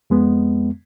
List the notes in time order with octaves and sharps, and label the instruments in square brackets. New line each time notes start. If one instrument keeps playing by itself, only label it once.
[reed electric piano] F2 G#3 B3